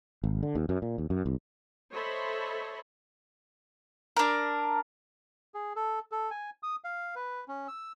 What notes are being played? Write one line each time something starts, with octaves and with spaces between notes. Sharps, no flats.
G#1
D3
D#2
F#2
A#2
D#2
F#2
C2
A4 C5 C#5 D#5 E5 B5
D4 A#4
G#4
A4
A4
G#5
D#6
F5
B4
C#4
E6